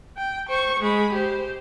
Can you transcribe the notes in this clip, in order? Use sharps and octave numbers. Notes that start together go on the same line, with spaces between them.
G5
C5 C#6
G#3 B5
G4 C5